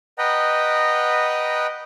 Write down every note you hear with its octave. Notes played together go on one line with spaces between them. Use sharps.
B4 D#5 F#5 G5 A#5